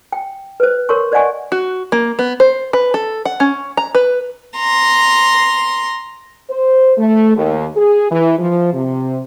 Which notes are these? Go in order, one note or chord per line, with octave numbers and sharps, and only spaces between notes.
G5
B4 C5
A#4 C#5 C6 C#6
C5 D5 D#5 F#5 G#5 C#6
F#4
A#3
B3
C5
B4
A4
F#5
C#4
A#5
B4
A#5 C6
C5
A3
D#2
G#4
E3
F3
C3